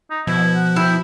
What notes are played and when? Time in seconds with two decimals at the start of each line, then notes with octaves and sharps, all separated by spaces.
0.11 D#4
0.27 B2 F3 E4
0.55 F#5
0.76 E4 G5